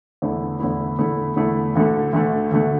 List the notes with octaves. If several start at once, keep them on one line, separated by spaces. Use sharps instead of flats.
E2 D3 A3 E4
E2 D3 A3 E4
E2 D3 A3 E4
E2 D3 A3 E4
D2 D3 A3
D2 D3 A3
D2 D3 A3